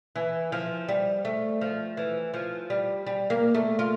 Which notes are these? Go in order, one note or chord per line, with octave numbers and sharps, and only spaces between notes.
E3
F3
G3
A3
F3
E3
F3
G3
G3
A#3
A3
F4